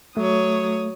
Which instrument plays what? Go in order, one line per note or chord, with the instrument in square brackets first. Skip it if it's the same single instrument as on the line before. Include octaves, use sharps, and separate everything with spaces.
[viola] F#3 [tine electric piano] A3 [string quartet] C#5 D#6